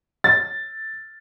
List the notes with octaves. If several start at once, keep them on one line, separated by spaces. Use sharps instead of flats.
A6